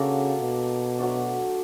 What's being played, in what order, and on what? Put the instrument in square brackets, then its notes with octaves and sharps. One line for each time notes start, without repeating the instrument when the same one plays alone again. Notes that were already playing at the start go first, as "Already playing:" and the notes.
Already playing: [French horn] C#3 [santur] A#3 D4 F#4 A4
[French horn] B2
[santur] F#3 A3 D4